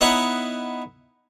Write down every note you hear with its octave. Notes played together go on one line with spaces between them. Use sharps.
B3 D#4 E4 C#5 F#5